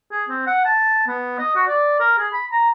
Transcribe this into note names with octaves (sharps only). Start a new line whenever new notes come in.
G#4
C4
F#5
A5
B3
D#5
F#4
D5
A#4
G#4
B5
A#5